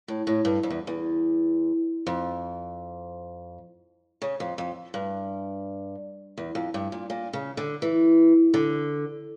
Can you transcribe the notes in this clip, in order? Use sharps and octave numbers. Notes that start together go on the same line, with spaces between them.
A2
A2
G2
F2
E2
E2
F2
C#3
F2
F2
G2
E2
F2
G2
A#2
A#2
C#3
D3
E3
D3